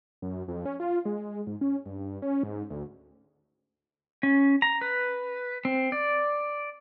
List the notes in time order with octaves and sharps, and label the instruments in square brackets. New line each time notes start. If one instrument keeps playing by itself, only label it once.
[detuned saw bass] F#2
F2
C#4
F4
G#3
G#3
G#2
C#4
G2
C#4
G#2
D2
[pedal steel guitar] C#4
A#5
B4
C4
D5